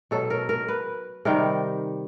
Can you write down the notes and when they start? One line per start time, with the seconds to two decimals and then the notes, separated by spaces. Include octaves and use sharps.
0.11 B2 F#3 A4
0.30 A#4
0.49 A#4
0.68 B4
1.25 C3 D#3 G3 A#4